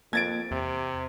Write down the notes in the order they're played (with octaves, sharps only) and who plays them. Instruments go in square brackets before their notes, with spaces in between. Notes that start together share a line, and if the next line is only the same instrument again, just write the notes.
[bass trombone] F2 [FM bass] A#3 [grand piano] G#6 A6 D7
[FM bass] E2 [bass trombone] C3